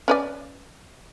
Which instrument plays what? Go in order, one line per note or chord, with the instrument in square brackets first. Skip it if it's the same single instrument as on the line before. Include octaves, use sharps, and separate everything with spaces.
[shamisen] C#4 B4 D5